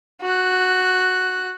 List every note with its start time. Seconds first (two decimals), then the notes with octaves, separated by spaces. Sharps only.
0.22 F#4 F#6